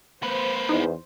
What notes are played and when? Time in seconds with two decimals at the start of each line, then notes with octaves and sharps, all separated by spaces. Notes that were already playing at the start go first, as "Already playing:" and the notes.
0.23 A#3 B4 C5
0.69 E2 D#4